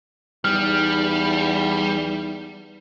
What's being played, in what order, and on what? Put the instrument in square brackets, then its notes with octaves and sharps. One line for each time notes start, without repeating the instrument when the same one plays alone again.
[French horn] E2 [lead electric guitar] G3 [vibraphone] D#4 [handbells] F6